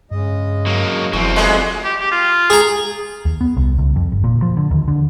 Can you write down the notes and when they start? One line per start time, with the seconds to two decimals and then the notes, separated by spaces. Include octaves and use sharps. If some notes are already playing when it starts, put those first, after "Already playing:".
0.11 G2 C#3 G#3 D#5
0.66 F#3 A#3
1.13 F1 E2 F#3 C4
1.36 G#3 A3 B3 F4 G#4 D5
1.84 G4
2.00 G4
2.12 F4
2.50 G#4 A#5
3.25 D#2
3.41 B3
3.57 C2
3.78 C#2
3.96 F2
4.12 G1
4.24 A#2
4.42 F3
4.57 D3
4.71 D#2
4.88 D3